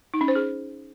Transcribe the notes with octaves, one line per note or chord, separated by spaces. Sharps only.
D#4
C#4
C5
G#4